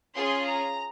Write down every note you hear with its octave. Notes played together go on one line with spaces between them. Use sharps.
C#4 F4 G#4 C6
A#5